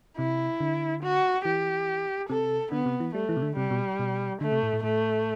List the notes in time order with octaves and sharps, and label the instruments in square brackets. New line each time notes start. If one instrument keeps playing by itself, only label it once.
[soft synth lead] C3 [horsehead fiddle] E4
[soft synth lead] D3
[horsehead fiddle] F#4
[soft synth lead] E3 [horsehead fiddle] G4
[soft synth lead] C3 [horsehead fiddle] A4
[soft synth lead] D3 [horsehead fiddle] B3
[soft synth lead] C3
E3
[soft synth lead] G3 [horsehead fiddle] A3
[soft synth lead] E3
C3
D3
[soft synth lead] C3 [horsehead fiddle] G3
[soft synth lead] B2
B2
[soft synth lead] D3 [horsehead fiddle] A3
[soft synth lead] C3
A2
A2
[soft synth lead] A2 [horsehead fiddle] A3